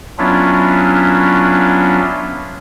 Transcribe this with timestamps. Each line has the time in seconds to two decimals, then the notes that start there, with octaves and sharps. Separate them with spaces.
0.18 F#3 B3 C#4 D4 E4 F4